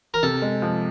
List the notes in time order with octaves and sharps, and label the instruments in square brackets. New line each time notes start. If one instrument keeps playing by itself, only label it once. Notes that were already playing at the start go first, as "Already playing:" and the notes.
[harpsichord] A#4
[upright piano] C3 [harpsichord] A4
[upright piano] G#3
F3